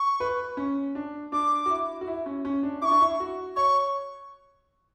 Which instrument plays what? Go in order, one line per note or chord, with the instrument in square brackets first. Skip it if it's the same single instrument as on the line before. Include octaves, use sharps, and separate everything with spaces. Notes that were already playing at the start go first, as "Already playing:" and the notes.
Already playing: [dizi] C#6
[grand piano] B4
C#4
D4
[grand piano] D4 [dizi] D6
[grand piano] F#4
E4
F#4
E4
C#4
C#4
D4
[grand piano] E4 [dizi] D6
[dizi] C#6
[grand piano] D4
E4
F#4
[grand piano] C#5 [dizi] C#6